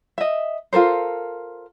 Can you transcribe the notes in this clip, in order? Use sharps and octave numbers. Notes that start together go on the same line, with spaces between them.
D#5 E5
F4 A4 A#4 C5